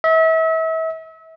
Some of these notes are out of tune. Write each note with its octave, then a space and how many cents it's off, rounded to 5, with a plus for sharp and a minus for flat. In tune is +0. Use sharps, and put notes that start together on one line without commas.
E5 -35